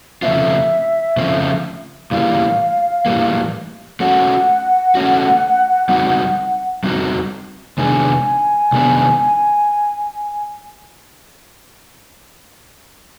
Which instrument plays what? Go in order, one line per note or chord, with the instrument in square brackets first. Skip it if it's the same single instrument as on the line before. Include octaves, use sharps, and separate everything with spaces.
[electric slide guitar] C#3 F3 A3 C4 F4 [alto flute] E5
[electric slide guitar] C#3 F3 A3 C4 F4
[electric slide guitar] A2 E3 G3 A#3 [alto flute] F5
[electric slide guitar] A2 E3 G3 A#3
[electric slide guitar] A3 C#4 F#4 [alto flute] F#5
[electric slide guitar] A3 C#4 F#4
G3 C4 D#4 F#4
G3 C4 D#4 F#4
[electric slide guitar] C3 D#3 G#3 B3 D4 [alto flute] G#5
[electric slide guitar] C3 D#3 G#3 B3 D4